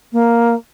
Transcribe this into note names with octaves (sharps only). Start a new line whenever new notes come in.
A#3